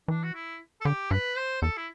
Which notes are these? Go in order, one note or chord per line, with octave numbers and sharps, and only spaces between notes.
E3 D4
F#4
E4
A4
D3 G4
G2 B4
C5
E2 A4
E4